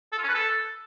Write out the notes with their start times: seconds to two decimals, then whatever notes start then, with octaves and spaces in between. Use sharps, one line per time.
0.13 A4
0.18 F4
0.24 C#4
0.29 B4
0.34 A4